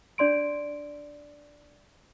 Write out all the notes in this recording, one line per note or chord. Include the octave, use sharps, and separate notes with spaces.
D4 D5 C6 D7